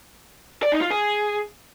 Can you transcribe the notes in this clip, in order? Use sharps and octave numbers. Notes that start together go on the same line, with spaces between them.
D5
D#4
F4
G#4